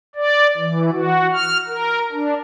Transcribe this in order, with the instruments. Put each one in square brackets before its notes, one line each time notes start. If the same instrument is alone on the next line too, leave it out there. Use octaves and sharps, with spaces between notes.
[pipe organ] D5
E3
F#4
F6
A#4
D4